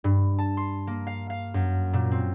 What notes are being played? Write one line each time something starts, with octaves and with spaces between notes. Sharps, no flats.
G2
A5
C6
A#3
F5
F5
F#2
A#2
C4